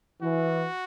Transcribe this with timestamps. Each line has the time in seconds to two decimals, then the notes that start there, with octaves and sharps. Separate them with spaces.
0.22 E3 F#4